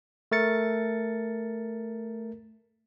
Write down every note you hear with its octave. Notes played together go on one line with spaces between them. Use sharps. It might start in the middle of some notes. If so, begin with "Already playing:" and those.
A3 A#4 A6 C#7